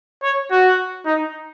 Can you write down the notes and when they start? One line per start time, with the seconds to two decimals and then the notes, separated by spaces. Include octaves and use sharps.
0.23 C#5
0.51 F#4
1.06 D#4